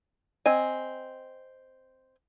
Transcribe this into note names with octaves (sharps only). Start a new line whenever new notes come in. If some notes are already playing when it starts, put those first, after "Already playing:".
C4 D#5 G#5